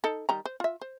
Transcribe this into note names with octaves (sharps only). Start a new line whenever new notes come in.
D#4 A4
D#3 G3 A#5
C5
F4 E5
C5